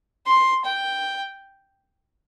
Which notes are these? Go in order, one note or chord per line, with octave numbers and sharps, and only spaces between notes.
C6
G5